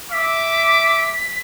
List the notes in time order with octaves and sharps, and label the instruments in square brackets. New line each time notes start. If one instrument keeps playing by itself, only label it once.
[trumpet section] E5 D6 [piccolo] B6